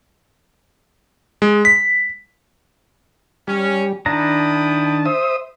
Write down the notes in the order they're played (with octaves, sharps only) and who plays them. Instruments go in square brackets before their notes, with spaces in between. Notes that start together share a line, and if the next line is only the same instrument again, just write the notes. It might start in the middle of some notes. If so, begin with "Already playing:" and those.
[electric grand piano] G#3
B6
[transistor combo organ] G3 [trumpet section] C#4
[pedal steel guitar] D#3 D4 A#5 [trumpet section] E4 G5 D#6 [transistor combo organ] A5
[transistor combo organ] C5 E5 D#6